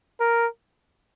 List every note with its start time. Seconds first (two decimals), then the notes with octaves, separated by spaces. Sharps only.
0.20 A#4